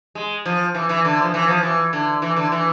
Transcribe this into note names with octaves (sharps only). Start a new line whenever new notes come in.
G#3
F3
E3
E3
D3
F3
E3
F3
E3
D3
E3
D3
E3